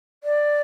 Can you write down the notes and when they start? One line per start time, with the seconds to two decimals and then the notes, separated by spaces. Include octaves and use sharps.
0.23 D5